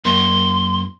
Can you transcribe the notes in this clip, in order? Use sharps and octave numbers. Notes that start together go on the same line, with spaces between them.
F#2 A#3 C6